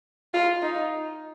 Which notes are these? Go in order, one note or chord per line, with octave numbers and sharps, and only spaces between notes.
F4
D#4